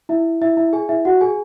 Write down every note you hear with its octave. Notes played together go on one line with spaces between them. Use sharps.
E4 E5
E4 E5
E4 E5
G#4 G#5
E4 E5
F#4 F#5
G#4 G#5